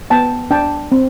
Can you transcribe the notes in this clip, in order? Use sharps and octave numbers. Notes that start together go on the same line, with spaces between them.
B3 G5 A5
D4 G5 A5
C4